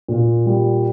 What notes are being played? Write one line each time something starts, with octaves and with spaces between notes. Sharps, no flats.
A#2
G3